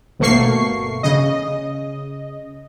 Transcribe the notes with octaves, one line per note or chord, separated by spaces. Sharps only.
G1 B2 A3 A#3 C#6 C7
C#3 D#5